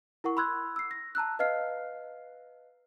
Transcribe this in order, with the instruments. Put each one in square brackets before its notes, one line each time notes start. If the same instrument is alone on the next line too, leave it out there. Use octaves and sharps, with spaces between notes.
[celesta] E4 A#4 F#5 C#6
B5 C6 E6 F#6 G#6
E6 C7
A#6
A5 A#5 E6 F#6
B4 D#5 F5 F6 C7